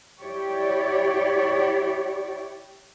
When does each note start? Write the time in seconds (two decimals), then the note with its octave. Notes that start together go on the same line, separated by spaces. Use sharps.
0.22 E4 G4 C#5 D5